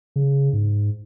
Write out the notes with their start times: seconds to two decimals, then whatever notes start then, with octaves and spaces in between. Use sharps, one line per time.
0.16 C#3
0.53 G#2